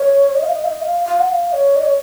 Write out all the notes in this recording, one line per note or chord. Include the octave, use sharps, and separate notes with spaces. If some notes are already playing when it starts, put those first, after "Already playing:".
Already playing: C#5
D#5
F5
D#5
F5
D#5
F5
F5
F#5
F5
C#5
D#5
C#5